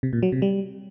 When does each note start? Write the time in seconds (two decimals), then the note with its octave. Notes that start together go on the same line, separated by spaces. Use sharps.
0.03 C3
0.13 A#2
0.23 F#3
0.32 C3
0.42 G3